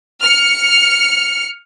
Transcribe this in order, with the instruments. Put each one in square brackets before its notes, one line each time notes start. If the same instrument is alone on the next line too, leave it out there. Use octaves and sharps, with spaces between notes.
[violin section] F6 C#7